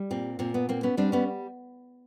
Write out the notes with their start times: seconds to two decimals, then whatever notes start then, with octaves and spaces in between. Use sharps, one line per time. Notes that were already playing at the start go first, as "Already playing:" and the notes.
Already playing: G3
0.11 A#2 C4
0.39 A#2 C4
0.54 B3
0.69 A#3 C4
0.83 B3 C#4
0.97 G3 C4 D4
1.12 B3 C#4